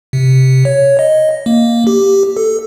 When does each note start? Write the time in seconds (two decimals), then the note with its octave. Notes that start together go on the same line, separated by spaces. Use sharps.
0.13 C3
0.65 C#5
0.99 D#5
1.46 A#3
1.87 G4
2.37 A4